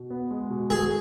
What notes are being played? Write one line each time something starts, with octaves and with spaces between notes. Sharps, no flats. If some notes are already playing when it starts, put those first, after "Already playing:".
Already playing: B2
B3
G#3
B2
F#4 G#4